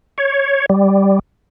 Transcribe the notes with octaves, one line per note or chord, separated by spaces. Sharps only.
C#5
G3